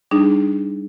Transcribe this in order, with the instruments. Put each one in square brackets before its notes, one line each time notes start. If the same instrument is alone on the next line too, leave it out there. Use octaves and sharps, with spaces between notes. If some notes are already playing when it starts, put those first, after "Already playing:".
[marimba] G3 D4 D#4 G#4